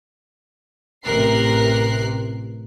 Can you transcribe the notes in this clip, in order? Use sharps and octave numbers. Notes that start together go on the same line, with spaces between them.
A1 C3 A#4 F#6 C7